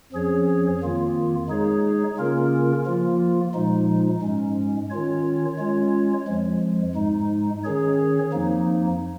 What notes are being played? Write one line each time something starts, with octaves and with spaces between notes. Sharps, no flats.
F2 F3 C#4 G#4 C#5
F2 D#3 A#3 F4
G#3 D#4 G#4 C#5
C#3 A#3 C#4 F4 A#4
F3 A#3 F4
A#2 F3 G#3 D#4
G#2 G#3 C#4
D#3 C#4 F4 C#5
G#3 C#4 F4 C#5
F2 F3 G#3
G#2 G#3 D#4
D#3 C#4 G#4 C#5
F2 F3 A#3 D#4